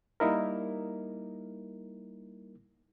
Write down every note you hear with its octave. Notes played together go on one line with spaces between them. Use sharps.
G3 A#3 D#4 E4 A#4